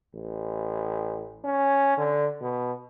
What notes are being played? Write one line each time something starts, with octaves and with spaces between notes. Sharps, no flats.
A1
C#4
D3
B2